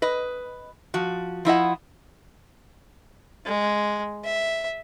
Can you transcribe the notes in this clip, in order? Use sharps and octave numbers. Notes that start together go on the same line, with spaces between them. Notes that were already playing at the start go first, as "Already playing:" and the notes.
B4 D#5
F3 F#4
F3 E4 D#5 F#5
G#3
E5